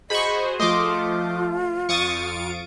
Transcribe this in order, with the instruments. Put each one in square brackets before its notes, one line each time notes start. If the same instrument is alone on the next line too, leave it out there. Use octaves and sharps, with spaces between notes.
[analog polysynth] F#4 G#4 C5 [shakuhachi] D#5 [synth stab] B5 C#6
[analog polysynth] F3 A3 [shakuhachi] F4 [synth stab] D#5 C6 D6
[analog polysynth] F2 F5 D7 [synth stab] C#6 D#6 A6